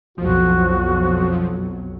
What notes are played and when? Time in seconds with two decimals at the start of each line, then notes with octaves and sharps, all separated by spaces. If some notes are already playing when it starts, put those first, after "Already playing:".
0.18 B1 F2 F3 F#3 F#4